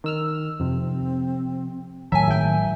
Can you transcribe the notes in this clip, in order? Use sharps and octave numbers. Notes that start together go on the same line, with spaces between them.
D#3 E6 F6
F2 C3 C4
A2 D#3 F#3 E5 G#5 A5
G#1 E5 G5